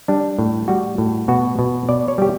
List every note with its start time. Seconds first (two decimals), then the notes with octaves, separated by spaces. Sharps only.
0.08 G3 D4
0.39 A2
0.68 G3 F#4
0.98 A2
1.28 B2 F#4
1.59 B2
1.89 B2 D5
2.08 C#5
2.18 G3 G4